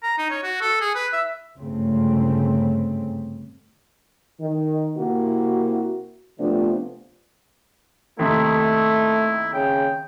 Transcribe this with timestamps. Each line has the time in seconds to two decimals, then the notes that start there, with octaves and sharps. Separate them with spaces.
0.03 A#5
0.18 D#4
0.30 C#5
0.43 F#4
0.61 A4
0.81 G#4
0.95 B4
1.13 E5
1.57 G1 G#2 C#3 A3 C4
4.40 D#3
4.98 C3 A#3 E4 F#4
6.40 C3 F3 A3 B3 D4 F4
8.19 D#2 C3 A3 D#4 E4
9.54 C#3 G5